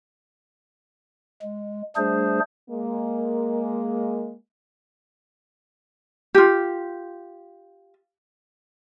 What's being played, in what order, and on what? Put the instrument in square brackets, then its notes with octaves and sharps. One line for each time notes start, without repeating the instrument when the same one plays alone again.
[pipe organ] G#3
G3 A3 D4 G#4 C5
[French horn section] G#3 A#3
[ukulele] F4 G4